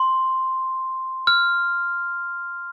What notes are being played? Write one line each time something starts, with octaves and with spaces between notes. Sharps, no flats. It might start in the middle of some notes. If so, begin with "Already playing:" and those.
Already playing: C6
F6